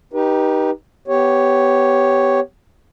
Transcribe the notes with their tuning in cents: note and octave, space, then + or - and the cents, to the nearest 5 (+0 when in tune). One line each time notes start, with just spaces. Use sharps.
D#4 +0 G4 +0 B4 -35
B3 +15 G4 +0 C#5 +0